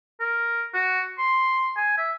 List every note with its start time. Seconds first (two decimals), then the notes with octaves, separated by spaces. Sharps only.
0.20 A#4
0.74 F#4
1.18 C6
1.77 G#5
1.98 E5